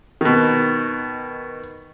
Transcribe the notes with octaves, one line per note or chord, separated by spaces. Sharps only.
B2 D#3